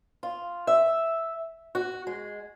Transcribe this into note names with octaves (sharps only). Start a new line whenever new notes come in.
F4
E5
F#4
G#3